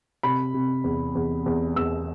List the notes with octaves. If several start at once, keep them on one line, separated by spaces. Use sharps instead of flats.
C3 B5
C3
E2
E2
E2
E2 E6